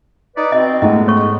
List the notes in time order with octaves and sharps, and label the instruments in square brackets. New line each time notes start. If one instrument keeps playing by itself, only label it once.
[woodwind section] D#4 B4 D5
[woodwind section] B2 C4 [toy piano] D#5
[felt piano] G#2 A3 D#4 [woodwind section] G#3 B3 [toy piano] D#5
[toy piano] C#5 C#6